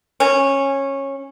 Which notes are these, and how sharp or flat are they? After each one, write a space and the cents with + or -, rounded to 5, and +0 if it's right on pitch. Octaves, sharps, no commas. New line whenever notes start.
C#4 -15